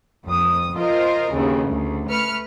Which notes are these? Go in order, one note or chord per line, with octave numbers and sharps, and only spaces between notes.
F2 D#6
F4 A#4 C5 D#5
G1 D#2 C#3 G#4
D2
A3 B4 F6 C#7